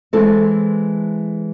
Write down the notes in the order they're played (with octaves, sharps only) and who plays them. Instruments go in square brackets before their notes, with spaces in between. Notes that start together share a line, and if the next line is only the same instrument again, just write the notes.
[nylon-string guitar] E3 G#3 C4 E4 A4